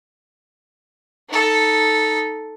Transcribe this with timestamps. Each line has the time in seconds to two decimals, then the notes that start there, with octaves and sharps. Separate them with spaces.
1.29 D#4 A4